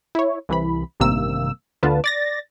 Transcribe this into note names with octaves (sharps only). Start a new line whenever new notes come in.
E4 C#5
C2 E3 B5
A1 G2 C3 D#3 A#3 E6
D2 D3 B3 F4 B4 A5
D5 A6 A#6